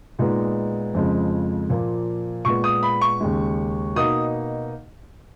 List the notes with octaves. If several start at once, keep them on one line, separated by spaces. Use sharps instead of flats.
A#2 G#3 B3 D#4
F2 C#3 F3 G#3
A#2 F3 A#3
A#2 G#3 B3 C#6
D#6
B5
C#6
D#2 C#3 G#3
B2 A#3 D#4 D#6